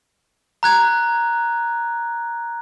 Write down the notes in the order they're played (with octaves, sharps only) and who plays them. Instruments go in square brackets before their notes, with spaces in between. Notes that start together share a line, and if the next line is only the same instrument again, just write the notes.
[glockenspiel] A#5 F#6 G#6